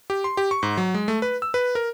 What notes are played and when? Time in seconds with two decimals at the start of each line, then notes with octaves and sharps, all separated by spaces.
0.10 G4
0.24 C6
0.37 G4
0.51 C#6
0.63 G#2
0.77 F#3
0.94 G#3
1.08 A3
1.22 B4
1.42 E6
1.54 B4
1.75 A#4